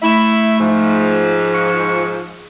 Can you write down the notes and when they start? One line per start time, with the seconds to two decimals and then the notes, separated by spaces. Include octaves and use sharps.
0.02 A3 E4 E5
0.60 G#2 F3
1.54 C#6